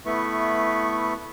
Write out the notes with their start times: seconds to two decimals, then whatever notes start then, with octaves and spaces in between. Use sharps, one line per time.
0.06 A3 B3 E4 B4 C#6